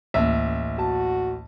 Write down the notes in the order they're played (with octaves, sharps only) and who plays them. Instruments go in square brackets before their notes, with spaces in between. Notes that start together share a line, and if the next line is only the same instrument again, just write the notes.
[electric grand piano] A1 [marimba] D2 A#3 [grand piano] E5
[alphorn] F#4 [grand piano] A5